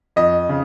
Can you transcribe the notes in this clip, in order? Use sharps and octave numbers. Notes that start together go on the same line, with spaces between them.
F2 D#5
C#3